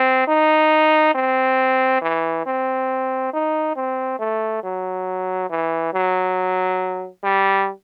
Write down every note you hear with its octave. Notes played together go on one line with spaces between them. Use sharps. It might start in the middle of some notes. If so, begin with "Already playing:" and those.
Already playing: C4
D#4
C4
E3
C4
D#4
C4
A3
F#3
E3
F#3
G3